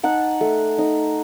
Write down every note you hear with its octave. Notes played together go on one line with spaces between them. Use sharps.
D#4 F#5 A5
A3
D#4